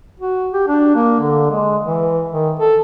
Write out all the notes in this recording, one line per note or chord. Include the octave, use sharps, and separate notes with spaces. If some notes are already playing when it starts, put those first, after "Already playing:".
F#4
G4
D4
A#3
D3
G#3
E3
D#3
A4